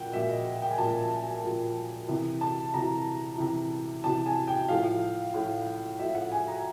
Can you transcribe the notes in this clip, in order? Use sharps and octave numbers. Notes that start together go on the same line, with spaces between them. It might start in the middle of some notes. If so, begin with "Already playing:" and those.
Already playing: A#2 F3 F#5 G5
A#2 F3 E5
D#5
G5
G#5
A#2 F3 A5
A#2 F3
C3 E3
A5
C3 E3 A#5
C3 E3
C3 E3 A5
G#5
G5
A2 F3 F5
A2 F3
A2 F3 E5
F#5
G#5
A#5